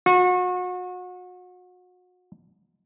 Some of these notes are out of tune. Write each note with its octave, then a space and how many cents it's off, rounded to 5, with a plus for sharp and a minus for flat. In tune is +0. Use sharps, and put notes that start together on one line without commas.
F#4 -35